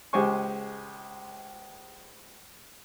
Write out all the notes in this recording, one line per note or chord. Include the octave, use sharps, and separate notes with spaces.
C#2 G#3 G4 C5 G#5 C#6